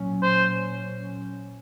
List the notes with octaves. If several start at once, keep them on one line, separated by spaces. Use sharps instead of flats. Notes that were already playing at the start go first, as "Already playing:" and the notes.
Already playing: A#2 F#3 C#4
C5